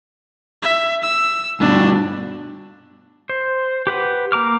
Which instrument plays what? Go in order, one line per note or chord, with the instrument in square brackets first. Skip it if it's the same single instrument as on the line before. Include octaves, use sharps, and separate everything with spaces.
[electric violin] E5
E6
[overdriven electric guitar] G2 B2 [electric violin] D4
[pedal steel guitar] C5
G4 B4 F#5
A#3 A#5 D6 F6